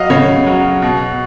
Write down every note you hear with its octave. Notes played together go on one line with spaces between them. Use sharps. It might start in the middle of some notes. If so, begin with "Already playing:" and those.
Already playing: F#3 D#5 F5
C#3 C#5
F#3
B2